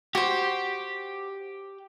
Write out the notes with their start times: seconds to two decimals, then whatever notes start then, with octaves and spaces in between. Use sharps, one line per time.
0.15 F#4 G4 C5